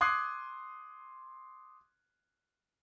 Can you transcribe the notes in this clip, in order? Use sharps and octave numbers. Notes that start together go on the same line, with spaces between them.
C6 D6 D#6 F#6 G#6 C7